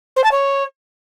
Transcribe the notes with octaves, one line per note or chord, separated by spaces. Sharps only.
C5
A5
C#5